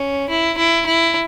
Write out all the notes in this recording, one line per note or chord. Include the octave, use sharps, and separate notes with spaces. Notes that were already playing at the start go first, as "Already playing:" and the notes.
Already playing: C#4
E4
E4
E4